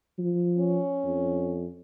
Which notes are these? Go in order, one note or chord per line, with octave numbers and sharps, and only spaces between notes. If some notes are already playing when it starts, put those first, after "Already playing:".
F3
C#4
F2